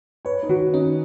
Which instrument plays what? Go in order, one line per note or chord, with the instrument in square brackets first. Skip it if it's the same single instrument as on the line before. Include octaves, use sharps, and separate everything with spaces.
[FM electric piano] B4 [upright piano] C#5
[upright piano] D#4
[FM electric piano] D#3 [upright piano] F#4
[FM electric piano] C#4 [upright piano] D#4